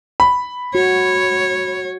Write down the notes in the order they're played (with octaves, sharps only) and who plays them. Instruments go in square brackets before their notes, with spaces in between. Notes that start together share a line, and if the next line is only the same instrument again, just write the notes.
[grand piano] B5
[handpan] F#4 [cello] C#5